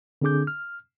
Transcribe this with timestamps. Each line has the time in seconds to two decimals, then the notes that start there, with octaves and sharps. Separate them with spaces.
0.22 D3 C4 D4 G#4 D6 G6
0.47 F6